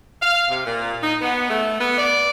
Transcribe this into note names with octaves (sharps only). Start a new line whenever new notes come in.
F5
C3
A#2
D#4
B3
A3
B3
D5